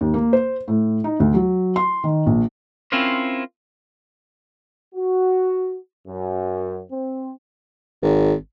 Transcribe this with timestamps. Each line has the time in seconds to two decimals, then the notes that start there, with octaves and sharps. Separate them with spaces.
0.01 D#2
0.14 A#3
0.33 C5
0.68 A2
1.04 D#4
1.20 D2
1.34 F#3
1.76 C6
2.04 D#3
2.26 A#1
2.92 C4 C#4 E4 F4 A#4 C5
4.95 F#4
6.07 F#2
6.90 C4
8.02 G#1